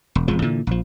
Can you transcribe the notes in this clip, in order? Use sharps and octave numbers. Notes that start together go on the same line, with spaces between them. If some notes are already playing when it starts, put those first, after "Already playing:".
E1
E1 F2 F3 G#3
A#2 D3 E3
A#1 F3